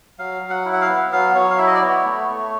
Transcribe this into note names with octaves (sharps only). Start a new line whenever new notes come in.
F#3 F5
F#3
F#5
E4
F#5
F5
B3
F#3 F5
F#3 C#5
F5
E4 E5
D#5
D5
B3 C#5
A3
A3